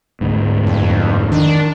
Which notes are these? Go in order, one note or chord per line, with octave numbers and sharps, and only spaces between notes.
D2 G#2
F2
D#3 D4